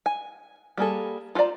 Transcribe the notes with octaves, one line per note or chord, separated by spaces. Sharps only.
G#5
G3 A#3 G#4 A4
F4 A4 C5 D5 A#5